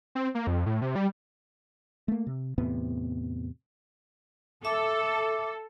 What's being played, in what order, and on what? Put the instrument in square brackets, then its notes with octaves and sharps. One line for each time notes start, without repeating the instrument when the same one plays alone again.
[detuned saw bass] C4
A#3
F2
A2
C3
G3
[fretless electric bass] A3 A#3
C3
E2 A2 C3 B3
[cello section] A4 [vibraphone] E5 [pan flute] D6